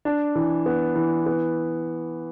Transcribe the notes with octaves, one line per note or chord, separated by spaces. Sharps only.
D4
E3
B3
E3
B3